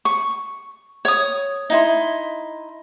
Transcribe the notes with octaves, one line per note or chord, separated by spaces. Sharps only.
C#6
C#5 D#6
D#4 E4 C6